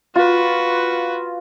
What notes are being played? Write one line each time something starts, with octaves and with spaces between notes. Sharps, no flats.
F4 F#4 B4